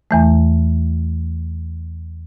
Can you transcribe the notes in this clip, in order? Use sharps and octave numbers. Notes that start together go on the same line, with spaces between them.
E2 E3 A3